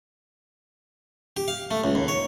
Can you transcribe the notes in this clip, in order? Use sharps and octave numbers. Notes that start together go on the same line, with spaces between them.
G4
F5
A3
C#2
D#2
C#5